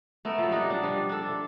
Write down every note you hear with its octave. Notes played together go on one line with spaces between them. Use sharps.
A3 B3 A#4
F3 F#3
G3 D#4 F#5
D4
F3 G3
D4 A4